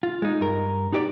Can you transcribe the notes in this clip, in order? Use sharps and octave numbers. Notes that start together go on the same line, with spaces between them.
F4
G#3 D#4
G2 A#4
D#4 F#4 G4 C#5 D5